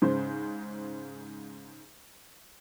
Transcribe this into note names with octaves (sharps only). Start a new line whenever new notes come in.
G#2 C#3 C5